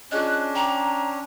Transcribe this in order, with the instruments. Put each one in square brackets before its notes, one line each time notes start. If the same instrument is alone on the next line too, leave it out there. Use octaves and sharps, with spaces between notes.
[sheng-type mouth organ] C#4 D4 [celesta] F4 G#4 D#5 [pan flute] F#6
[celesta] G5 D6 [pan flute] A#5